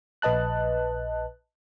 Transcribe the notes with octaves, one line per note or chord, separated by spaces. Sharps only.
A#1 B4 D#5 A5 F#6